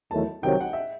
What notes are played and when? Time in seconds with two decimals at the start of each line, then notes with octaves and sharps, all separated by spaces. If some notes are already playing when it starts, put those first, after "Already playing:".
0.10 E2 D#3 F#3 A3 E4 A5
0.43 C2 C3 D#3 F#3 G5
0.60 F#5
0.73 E5